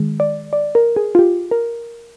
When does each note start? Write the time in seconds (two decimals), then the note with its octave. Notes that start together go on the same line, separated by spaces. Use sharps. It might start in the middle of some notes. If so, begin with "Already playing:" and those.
Already playing: D#3 G#3
0.20 D5
0.53 D5
0.75 A#4
0.96 G#4
1.15 F4
1.19 G4
1.51 A#4